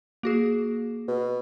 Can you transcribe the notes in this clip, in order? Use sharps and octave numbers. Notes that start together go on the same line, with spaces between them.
A#3 F#4 G#4
B2